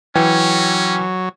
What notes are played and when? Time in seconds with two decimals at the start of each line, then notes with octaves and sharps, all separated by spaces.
0.15 E3 F#3 C#4 G5